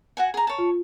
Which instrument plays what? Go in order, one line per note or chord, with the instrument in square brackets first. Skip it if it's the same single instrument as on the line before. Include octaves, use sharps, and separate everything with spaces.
[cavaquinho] F#4 F#5 G#5
G#4 A#5
C#5 A5
[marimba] F4